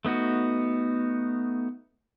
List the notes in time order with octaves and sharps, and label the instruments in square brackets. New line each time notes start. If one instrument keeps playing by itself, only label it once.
[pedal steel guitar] A3 B3 D#4 F#4